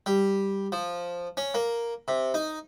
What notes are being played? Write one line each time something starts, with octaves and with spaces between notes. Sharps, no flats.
G3
F3
C#4
A#3
C3
D#4